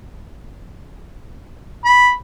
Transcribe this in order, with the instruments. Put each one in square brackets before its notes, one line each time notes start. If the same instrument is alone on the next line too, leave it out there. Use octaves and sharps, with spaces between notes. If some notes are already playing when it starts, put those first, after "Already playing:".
[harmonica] B5